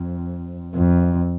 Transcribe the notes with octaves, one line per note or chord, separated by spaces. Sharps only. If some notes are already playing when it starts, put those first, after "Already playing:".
Already playing: F2
F2